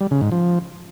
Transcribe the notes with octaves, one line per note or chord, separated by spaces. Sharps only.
G3
C#3
G#2
F3